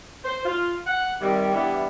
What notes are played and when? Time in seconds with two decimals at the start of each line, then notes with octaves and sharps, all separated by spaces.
0.25 C5
0.45 F4
0.87 F#5
1.21 C3 D#3 G3
1.54 E3 G3 B3 D4 E4